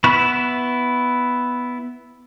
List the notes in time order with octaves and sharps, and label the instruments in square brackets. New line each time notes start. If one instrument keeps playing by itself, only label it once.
[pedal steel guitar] B3 E4 C#6 F#6